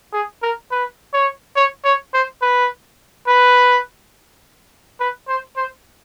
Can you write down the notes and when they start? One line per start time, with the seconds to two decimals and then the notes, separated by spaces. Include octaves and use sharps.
0.13 G#4
0.43 A#4
0.71 B4
1.14 C#5
1.56 C#5
1.85 C#5
2.14 C5
2.42 B4
3.28 B4
5.00 B4
5.28 C5
5.57 C5